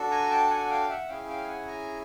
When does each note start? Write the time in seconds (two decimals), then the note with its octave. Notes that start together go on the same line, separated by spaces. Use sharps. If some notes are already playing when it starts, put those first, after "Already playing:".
Already playing: D4 F#4 A4
0.11 G#5 A#5
0.31 G5 A5
0.50 F#5 G#5
0.70 F5 G5
0.89 E5 F#5
1.09 C#4 E4 G#4 F5 G5
1.29 F5 G5
1.48 F#5 G#5
1.68 G#5 A#5